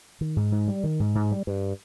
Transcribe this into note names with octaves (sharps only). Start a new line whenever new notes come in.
D#3
G#2
G#2
G3
D#3
G#2
G#2
G3
G2